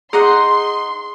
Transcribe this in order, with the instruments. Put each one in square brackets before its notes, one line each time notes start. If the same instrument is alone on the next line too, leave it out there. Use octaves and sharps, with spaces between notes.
[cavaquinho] D#4 D#5 F#5 [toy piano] G#4 [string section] C6